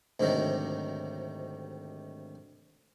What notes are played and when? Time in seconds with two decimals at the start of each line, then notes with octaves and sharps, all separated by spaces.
0.20 D2 G#2 C3 D#3 F#3